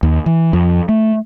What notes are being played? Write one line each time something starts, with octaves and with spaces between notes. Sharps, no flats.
D#2
E3
F2
A3